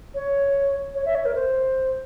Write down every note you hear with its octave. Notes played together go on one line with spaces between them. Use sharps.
C#5
C#5
E5
C#5
A#4
C5